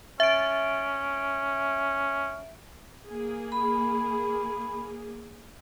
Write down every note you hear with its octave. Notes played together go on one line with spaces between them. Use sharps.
C#4 E5 D7
A#3 G#4
B5